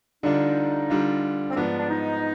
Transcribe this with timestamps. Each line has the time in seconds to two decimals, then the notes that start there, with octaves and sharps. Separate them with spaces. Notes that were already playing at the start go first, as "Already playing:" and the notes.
0.23 D3 G3 D4 D#4 F4
0.90 D3 G3 D4 F4
1.50 C4
1.56 G#2 F3 B3 D4
1.78 D4
1.89 D#4